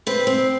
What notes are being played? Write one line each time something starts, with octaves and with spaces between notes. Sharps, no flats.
C4 B4
C4